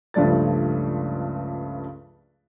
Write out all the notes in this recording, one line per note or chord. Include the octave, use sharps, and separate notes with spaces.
C#2 G2 F3 A3 D5 A6